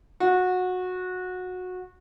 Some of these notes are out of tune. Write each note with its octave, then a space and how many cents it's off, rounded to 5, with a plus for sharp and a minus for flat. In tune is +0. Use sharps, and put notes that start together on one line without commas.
F#4 -20